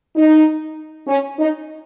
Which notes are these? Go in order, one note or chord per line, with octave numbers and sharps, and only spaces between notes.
D#4
C#4
D#4